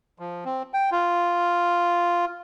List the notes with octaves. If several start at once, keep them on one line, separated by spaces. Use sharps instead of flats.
F3
C4
G5
F4